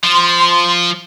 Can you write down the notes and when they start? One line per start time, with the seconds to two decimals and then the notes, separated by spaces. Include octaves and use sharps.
0.04 F3 C6